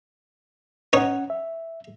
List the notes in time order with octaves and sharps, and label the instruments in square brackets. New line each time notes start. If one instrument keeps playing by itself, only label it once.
[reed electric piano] C#4 F#5 [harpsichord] D#4 C#5
[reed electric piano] E5